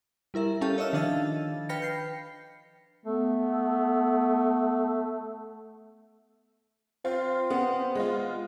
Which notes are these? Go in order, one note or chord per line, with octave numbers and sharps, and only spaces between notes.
G3 E4 A#4 E5
C#4 G4 A4 F5 A5
C#5 D#5 E5 E6 F6
D#3 F3 D4 D#5 F5 A6
B4 G5 B5 F6 A#6 C#7
G6 C7
A3 B3
C4 F4
B3
G#3 F4